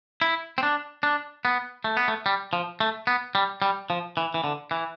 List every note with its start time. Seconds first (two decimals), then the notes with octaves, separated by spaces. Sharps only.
0.21 E4
0.58 C4
0.63 D4
1.03 D4
1.45 B3
1.84 A3
1.97 B3
2.08 A3
2.26 G3
2.53 F3
2.80 A3
3.07 B3
3.35 G3
3.62 G3
3.90 F3
4.17 E3
4.34 E3
4.44 D3
4.71 E3